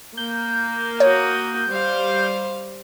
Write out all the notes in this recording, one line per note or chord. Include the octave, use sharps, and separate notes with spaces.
A#3 G6
F#4 C#5 D#6
G3 C5 F5